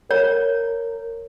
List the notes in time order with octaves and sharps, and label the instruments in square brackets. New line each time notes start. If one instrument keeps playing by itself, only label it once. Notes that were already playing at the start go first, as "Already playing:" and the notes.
[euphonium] A#4 [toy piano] C#5